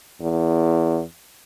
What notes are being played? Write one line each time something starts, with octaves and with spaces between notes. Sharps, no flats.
E2